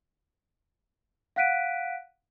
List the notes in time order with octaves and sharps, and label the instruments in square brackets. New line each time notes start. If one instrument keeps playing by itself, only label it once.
[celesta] F5 F#5 F#6 B6 D7 D#7